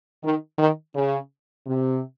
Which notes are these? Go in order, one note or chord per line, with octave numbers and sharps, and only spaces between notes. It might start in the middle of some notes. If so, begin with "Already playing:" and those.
D#3
D#3
C#3
C3